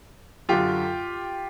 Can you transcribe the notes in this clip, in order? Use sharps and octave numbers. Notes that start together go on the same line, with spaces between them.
F#2 D3 F4 G4